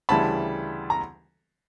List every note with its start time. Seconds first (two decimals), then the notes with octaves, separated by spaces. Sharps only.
0.09 D2 C#3 E3 G3 A5 B5
0.90 A#5